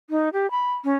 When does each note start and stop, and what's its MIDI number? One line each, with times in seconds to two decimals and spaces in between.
0.10 0.29 63
0.33 0.50 67
0.51 0.72 83
0.84 0.94 61